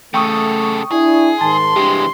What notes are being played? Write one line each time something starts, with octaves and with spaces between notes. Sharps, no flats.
C#3 A3 A4 G5 C#6 D#6
D4 E4 G#4
G#2 D#3 A5 C6
C3 E3 G3 G#3 D4 G4